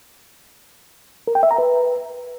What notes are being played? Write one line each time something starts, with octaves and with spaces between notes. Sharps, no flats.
A#4
G5
E5
A#5
B4